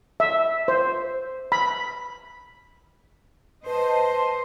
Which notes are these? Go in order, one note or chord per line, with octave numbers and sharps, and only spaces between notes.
E5
C5
B5
B4 C5 D#5 A5
C6